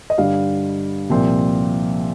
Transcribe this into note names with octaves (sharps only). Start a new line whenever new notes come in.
D#5
G2 D3 G3 F5
C2 A#2 F3 C4